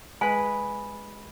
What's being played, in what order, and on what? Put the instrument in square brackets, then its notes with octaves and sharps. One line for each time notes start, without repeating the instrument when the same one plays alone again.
[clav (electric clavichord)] G#3 B4 [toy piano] G#5 [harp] B5